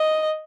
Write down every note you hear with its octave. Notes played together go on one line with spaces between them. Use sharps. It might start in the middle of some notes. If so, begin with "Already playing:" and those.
Already playing: D#5